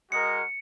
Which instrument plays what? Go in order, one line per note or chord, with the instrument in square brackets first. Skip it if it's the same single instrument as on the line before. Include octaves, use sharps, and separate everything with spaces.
[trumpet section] G#3 F#4 A#4 D#5 [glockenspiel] C#7